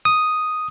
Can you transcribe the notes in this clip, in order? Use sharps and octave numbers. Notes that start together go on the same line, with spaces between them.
D#6